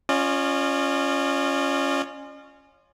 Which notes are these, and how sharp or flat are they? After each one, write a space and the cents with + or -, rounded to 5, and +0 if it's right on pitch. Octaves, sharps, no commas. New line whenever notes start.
C#4 +0 F4 +0 D#5 -45